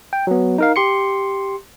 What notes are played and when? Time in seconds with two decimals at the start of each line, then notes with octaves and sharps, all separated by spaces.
0.13 G5
0.27 F#3 B3
0.58 D#4 A#4 F5
0.76 G4 C6 C#7